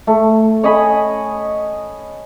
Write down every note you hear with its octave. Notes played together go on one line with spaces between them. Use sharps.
A3
C#5 D#5 G#5 B5